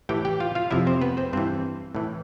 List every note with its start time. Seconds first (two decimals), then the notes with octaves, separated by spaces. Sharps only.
0.09 A2 E3 G4 G5
0.25 G4 G5
0.40 F4 F5
0.55 F4 F5
0.71 F2 C3 F3 E4 E5
0.87 C4 C5
1.02 B3 B4
1.17 C4 C5
1.33 G2 E3 C4 C5
1.95 A2 E3